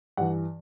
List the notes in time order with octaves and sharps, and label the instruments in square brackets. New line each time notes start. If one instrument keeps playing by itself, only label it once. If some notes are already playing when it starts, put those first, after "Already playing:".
[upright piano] G2 E3 F#5